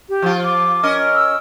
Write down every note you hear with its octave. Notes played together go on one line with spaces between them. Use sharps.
G4
F3 F4
D6
C#4 A#4 D#5
E6